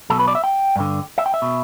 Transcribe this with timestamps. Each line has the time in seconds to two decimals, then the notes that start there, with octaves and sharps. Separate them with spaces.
0.10 B1 B2 A4
0.19 B4
0.28 D5
0.35 E5
0.44 G5
0.76 G2 D3
1.18 E5
1.26 G5
1.34 E5
1.42 B2